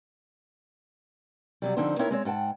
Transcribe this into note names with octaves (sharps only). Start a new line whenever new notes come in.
C3 F#3 G3
D3 F3 C4 D#4 C5
C4 D#4 E4 A#4 C#5
G#3 C4 C#5
G#2 F#5 G5 A5